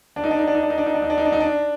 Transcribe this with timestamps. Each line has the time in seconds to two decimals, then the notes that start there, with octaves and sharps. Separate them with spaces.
0.16 D4
0.24 D#4
0.31 D4
0.39 D#4
0.48 D4
0.55 D#4
0.63 D4
0.70 D#4
0.78 D4
0.86 D#4
0.94 D4
1.02 D#4
1.10 D4
1.18 D#4
1.25 D4
1.32 D#4
1.41 D4